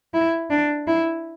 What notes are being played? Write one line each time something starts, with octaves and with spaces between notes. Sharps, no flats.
E4
D4
E4